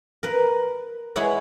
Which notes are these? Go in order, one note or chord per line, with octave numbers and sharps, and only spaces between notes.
A#4 B4
G#3 E4 C#5 F#5 B5